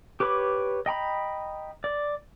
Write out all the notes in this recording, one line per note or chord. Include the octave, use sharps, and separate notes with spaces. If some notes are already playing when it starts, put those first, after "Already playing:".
G4 B4 C#5 B5 D6
D#5 G5 A#5 B5
D5